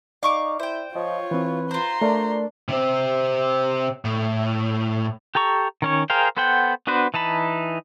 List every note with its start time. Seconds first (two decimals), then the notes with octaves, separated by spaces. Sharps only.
0.23 D#4 D5 F5 C#6 D6
0.59 E4 C5 G5
0.95 F3 F4 C#5 D#5
1.31 E3 C4 B4
1.71 F4 C5 A#5 C6
2.02 A3 D4 A#4 D5
2.69 C3 C4
4.05 A2
5.35 G4 A4 A#5 C#6
5.82 D#3 C#4 C#5
6.10 G#4 A#4 C5 F5 G5
6.37 B3 A4 C5 F#5 G5
6.87 B3 D4 F#4 B4 C5
7.14 E3 D#4 A5 B5